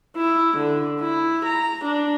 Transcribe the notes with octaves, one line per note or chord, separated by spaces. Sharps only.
E4
D3
E4
A#5
D4